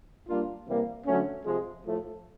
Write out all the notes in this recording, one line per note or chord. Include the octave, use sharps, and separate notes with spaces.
G3 A#3 D4 F4
C3 E3 G3 A#3
D3 F#3 A3 C#4
C3 F3 G#3
A2 F3 A3